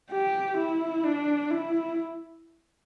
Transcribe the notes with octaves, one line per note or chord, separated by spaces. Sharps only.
G4
E4
D4
E4